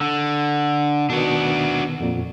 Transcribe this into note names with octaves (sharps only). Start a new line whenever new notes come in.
D3
B2 D#3 B3 D4 F#4
F2 A#2